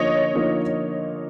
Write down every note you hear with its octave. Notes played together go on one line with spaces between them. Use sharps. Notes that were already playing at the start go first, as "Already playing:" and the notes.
Already playing: D3 F3 A#3 D#4 C#5 D#5
D3 F3 A#3 D#4